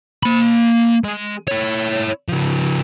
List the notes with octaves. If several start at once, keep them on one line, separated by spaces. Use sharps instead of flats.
A#3 B5
G#3
E4 C#5
C#3 F3